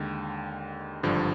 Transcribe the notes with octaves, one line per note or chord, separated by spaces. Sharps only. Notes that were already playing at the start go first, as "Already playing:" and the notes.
Already playing: D#2 D3 G#3 G5
G#1 G2 D3 F3